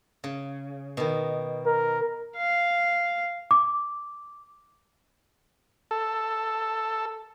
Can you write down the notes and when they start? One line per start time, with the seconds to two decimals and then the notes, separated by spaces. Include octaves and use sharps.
0.24 C#3
0.97 B2 D#3
1.66 A#4
2.37 F5
3.51 D6
5.91 A4